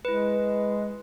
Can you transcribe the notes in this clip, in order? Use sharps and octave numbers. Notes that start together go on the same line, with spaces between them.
G#3 E4 B4